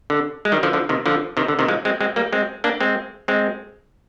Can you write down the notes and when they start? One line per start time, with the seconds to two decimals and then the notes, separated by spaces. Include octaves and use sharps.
0.10 D3
0.45 G#3
0.52 D#3 G3
0.63 D3 F3
0.73 D3 F3
0.89 C3 D#3
1.06 D3 F3
1.37 C3 D#3
1.48 D3
1.59 C3 D#3
1.68 F3 G#3
1.85 G#3 C4
2.01 G#3 C4
2.16 G3 A#3
2.33 G#3 C4
2.64 A#3 D4
2.80 G#3 C4
3.28 G#3 C4